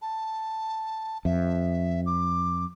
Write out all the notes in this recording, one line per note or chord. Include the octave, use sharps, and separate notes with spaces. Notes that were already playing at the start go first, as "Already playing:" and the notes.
A5
F2 E5
D6